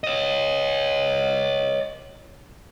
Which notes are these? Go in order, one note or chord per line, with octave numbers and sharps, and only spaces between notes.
C#5 D#5